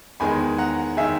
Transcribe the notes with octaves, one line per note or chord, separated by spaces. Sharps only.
E2 D#3 G#3 G#5 B5
F#5 A#5
D#3 G#3 E5 G#5